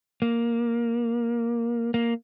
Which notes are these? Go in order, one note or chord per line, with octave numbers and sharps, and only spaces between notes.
A#3
A#3